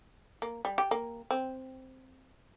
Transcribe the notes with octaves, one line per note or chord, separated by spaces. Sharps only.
A#3
G3
G4
A#3
C4